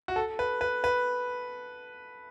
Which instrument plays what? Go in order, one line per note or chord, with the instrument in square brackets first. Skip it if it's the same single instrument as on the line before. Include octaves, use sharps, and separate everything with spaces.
[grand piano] F#4
A4
B4
B4
B4